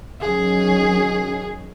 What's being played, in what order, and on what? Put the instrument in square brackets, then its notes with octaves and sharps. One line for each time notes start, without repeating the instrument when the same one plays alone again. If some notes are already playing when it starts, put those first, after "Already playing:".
[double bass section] D#3 F#3 C#4 [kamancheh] G#4